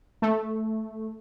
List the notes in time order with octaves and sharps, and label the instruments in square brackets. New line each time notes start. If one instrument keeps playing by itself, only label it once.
[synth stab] A3